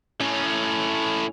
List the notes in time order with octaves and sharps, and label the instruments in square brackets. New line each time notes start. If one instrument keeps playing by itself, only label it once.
[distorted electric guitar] A2 C#4